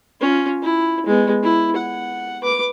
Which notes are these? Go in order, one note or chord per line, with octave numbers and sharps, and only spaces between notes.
C#4 F4
E4
G#3 B3
E4
F#5
B4 D6